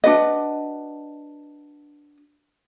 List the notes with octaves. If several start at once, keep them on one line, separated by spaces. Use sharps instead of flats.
D4 F#4 B4 D#5